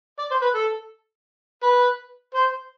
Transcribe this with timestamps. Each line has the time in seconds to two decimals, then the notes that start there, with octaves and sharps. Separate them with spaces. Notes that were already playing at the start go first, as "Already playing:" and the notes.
0.19 D5
0.31 C5
0.42 B4
0.55 A4
1.63 B4
2.34 C5